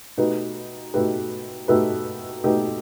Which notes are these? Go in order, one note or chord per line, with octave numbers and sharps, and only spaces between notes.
B2 A3 D#4 G4 B4
B2 A3 D#4 G4 B4
B2 A3 D#4 G4 B4
B2 A3 D#4 G4 B4